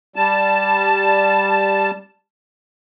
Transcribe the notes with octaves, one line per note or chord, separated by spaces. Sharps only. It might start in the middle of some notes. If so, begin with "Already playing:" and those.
G3 A5